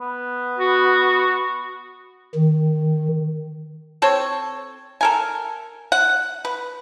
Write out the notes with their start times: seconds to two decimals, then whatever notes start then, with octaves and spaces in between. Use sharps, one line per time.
0.01 B3
0.58 F#4
2.35 D#3
4.02 C4 A4 C#5
5.01 A4 A#4 G#5
5.92 F#5
6.45 B4